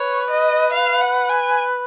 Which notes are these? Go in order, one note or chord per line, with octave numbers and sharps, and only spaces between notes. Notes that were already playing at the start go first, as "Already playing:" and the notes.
Already playing: B4 C#5
D#5
F5
F#5
G#5